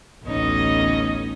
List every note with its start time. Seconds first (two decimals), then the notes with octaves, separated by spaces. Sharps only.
0.25 A1 D2 B3 C#4 D#4 D#5